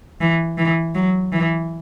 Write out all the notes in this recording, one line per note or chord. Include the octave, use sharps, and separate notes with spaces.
E3
E3
F#3
E3